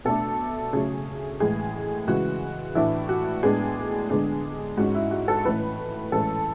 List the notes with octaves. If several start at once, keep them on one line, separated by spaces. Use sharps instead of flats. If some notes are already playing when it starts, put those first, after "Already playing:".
B2 A3 D4 A4
C#3 F#3 A3 C#4 G#4
A2 E3 G#3 G#4
C#3 E3 G#3 F#4
A2 E3 A3 D4 E4
F#4
A2 G#3 B3 D4 G#4
D3 G#3 B3 D4 G#4
G#2 G#3 C#4 F#4
E4
F#4
A4
A2 E3 A3 C#4 B4
A2 E3 G#3 C#4 A4